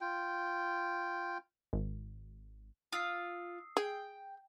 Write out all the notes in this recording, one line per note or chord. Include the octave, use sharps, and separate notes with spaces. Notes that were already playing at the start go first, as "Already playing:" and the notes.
F4 G5
G#1
F4 D#6 E6 C7
G#4 G5